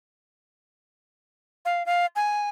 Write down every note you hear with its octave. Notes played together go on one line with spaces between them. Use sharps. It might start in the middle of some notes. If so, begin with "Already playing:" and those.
F5
F5
G#5